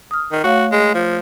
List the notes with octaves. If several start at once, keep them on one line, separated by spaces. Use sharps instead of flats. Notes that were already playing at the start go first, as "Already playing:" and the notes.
D#6 F6
D#3
A3 F#4 C#5 F5
G#3
F3